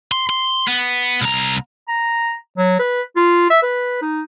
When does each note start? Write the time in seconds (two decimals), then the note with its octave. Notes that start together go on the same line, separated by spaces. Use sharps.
0.12 C6
0.29 C6
0.67 B3
1.22 C2 A#5
1.88 A#5
2.58 F#3
2.79 B4
3.16 F4
3.50 E5
3.63 B4
4.02 D#4